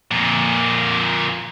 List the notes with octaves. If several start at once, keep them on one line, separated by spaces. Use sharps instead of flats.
F2 A#2